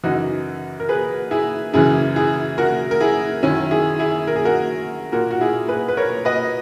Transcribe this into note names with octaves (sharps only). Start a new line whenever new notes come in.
F#2 C#3 E3 D#4 F#4
A#4
G#4 B4
E4 G#4
F#2 C#3 E3 E4 G#4
E4 G#4
F#4 A#4
A#4
E4 G#4
F#2 D#3 C#4 E4
E4 G#4
E4 G#4
A#4
G#4
F#4 A#4
A#2 F#4 A#4
F#4
E4 G#4
G#4 B4
B4
A#4 C#5
B4 D#5